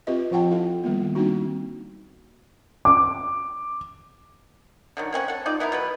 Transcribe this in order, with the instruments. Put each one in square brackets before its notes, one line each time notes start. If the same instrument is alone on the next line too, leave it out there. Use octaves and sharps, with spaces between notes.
[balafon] C4 F4 G4 B4 D#5 E5
F3 F4 F#5 G5 A5
E4 A4 F5
D#3 G3 A#3 B3
G3 A#3 C4 D4 D#4 F#4
[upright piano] D6
[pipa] D3 D#3 F#3
A#3 C4 C#4 F#5
A4 F#5
D#4 F4 D5
B3 E4 F4 A#4
B2 F#3 B4